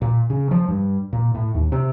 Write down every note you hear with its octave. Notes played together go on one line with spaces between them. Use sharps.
A#2
C#3
F3
G2
A#2
A2
D#2
C3